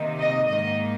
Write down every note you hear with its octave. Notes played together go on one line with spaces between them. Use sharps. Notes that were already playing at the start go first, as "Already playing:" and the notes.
Already playing: C3 D#3 A#3 D#4
D#5
G#2 D#3 A#3 D#4 D#5